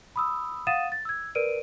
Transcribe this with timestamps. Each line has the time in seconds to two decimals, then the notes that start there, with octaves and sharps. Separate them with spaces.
0.16 B5 D#6 E6
0.67 F5 F#5 D#6 A6 D#7 E7
0.92 A6
1.05 E6 G#6
1.35 A#4 B4 D5 D7 D#7